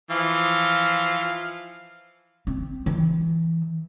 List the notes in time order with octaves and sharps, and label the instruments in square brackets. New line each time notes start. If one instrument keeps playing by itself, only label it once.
[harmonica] E3 F3 F5
[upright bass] C4
E3